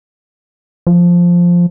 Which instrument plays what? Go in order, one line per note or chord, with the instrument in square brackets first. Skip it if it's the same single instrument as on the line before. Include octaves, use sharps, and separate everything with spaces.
[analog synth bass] F3